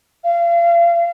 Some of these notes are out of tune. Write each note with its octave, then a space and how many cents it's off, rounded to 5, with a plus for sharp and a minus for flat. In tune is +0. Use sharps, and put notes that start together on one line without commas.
F5 -35